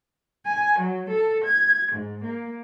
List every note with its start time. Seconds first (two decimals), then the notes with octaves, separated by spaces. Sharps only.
0.46 G#5
0.80 F#3
1.10 A4
1.45 G#6
1.93 G#2
2.24 A#3